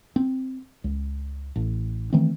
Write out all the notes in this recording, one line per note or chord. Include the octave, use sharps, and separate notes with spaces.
C4
C#2
A1
D#3 E3 A3 C4